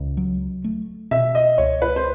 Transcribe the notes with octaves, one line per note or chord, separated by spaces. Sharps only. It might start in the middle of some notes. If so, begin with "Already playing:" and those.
Already playing: C#2
F#3
A3
B2 E5
D#5
C#2 C#5
B4
C5